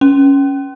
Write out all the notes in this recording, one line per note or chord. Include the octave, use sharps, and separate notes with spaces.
C#4